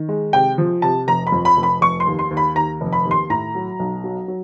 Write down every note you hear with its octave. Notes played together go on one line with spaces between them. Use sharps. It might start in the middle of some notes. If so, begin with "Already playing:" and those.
Already playing: D#3
G#3
C3 G5
F3
C3 A5
F1 A#5
B5
F2
B5
F1
B5
F1 C#6
C6
D#2
C6
D#2
B5
D#2 A#5
F1
B5
D#2
C6
A2 A#5
F#3
B1
F#3
F#3